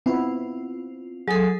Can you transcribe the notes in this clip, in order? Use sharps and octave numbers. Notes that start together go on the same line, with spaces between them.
B3 C4 E4 F4
F#3 G#4 A4